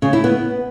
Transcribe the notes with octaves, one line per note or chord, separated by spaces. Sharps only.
C#3
E4
B3